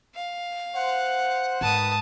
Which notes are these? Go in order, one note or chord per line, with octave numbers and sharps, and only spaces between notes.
F5
C5 F#5
G#2 D#3 A3 B4 A5 D#6